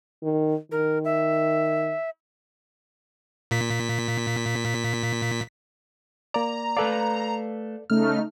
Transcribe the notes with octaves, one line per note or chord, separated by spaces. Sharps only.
D#3
D#3 A#4
E5
A#2 B6
A#3 D5 A#5
A3 A4 B4 D5 F5
C#3 A3 D#4 F6